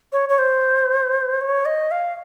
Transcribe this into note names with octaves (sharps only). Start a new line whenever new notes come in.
C#5
C#5
C5
C#5
D#5
F5